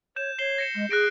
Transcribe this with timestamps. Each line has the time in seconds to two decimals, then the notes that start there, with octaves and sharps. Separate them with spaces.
0.16 C#5 G6 E7
0.39 C#5 C7 E7 G7
0.58 A#6 C#7 E7
0.74 G#3
0.90 G#4 F#6 A#6 D7